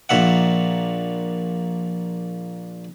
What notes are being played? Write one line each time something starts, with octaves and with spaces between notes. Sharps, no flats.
A#1 A#2 E5 F#5